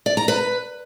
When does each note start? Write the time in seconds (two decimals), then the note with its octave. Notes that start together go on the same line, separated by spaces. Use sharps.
0.06 D5
0.17 A#5
0.28 B4